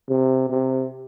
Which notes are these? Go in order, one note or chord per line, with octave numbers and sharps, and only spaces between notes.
C3
C3